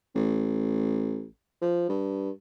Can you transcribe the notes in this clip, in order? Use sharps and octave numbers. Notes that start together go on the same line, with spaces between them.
A1
F3
G2